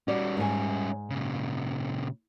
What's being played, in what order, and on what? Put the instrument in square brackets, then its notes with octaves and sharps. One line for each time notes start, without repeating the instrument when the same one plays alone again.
[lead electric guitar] G3 C#4 [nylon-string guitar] F#4 D5
[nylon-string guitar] G#2 A#4 G#5
[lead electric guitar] A#2 C#3